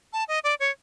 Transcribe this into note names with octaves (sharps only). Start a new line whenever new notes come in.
A5
D#5
D5
C#5